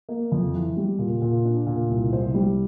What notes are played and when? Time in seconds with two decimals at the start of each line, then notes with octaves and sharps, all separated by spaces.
0.09 A#3
0.32 F2
0.54 E3
0.77 G3
0.99 A#2
1.22 A#2
1.45 D4
1.67 A#2
1.89 C2
2.12 C2 C5
2.34 G3